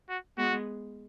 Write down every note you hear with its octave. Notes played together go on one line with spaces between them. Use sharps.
F#4
G#3 B3 F#4